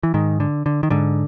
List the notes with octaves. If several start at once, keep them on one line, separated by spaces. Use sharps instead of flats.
E3
G#2 D#3
D3
D3
D#3
G#2 D3